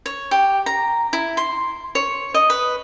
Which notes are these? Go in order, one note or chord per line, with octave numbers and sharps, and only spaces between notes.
C#5
G4
A#5
E4
C6
C#5
D#5
B4